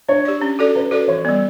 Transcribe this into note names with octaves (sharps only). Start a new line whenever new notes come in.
D4 C#5
G4 D5
C#4
F#4 A4 D5
C#4 B4
F#4 A4 B4 D5
E3 C#5
G3 B3 D5